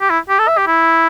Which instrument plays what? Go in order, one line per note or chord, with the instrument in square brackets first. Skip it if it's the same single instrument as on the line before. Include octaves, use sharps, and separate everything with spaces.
[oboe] G4
E4
G4
A4
E5
G4
E4